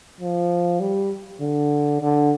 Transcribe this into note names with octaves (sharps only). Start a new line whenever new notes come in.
F3
G3
D3
D3